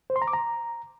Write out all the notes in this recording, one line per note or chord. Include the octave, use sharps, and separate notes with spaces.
C5
C6
A#5
D6
A#5